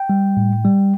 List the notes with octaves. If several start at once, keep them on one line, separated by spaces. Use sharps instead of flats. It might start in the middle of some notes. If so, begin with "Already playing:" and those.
Already playing: G5
G3
A2
G3